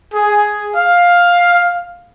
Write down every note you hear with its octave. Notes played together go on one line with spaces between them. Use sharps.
G#4
F5